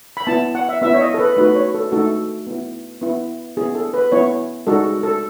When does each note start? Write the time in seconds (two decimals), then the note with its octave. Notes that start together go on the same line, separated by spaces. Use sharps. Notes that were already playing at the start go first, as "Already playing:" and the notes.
0.17 B5
0.27 B3 E4 A5
0.55 F#5
0.69 E5
0.82 B3 E4 E5
0.94 C#5
1.01 D#5
1.14 A4
1.19 B4
1.37 A3 D#4 F#4 B4
1.55 C#5
1.74 A4
1.92 A3 D#4 F#4 A4
2.47 B3 E4
3.02 B3 E4
3.57 B3 E4 G#4
3.75 A4
3.94 B4
4.12 B3 E4 C#5
4.67 G#3 D#4 F#4 A4
5.03 A4